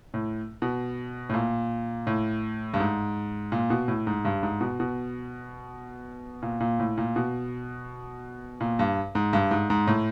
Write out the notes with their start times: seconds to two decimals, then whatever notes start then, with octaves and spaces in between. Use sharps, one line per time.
0.14 A2
0.62 B2
1.30 A2
1.34 A#2
2.07 A2
2.74 G2
2.80 G#2
3.52 A#2
3.70 B2
3.88 A2
4.07 G#2
4.25 G2
4.43 G#2
4.61 B2
4.80 B2
6.42 A#2
6.60 A#2
6.80 A2
6.98 A#2
7.16 B2
8.61 A#2
8.79 G2
9.15 G#2
9.33 G2
9.51 G#2
9.70 G#2
9.87 A2